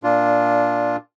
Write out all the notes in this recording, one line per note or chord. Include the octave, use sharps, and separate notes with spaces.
A#2 D4 F4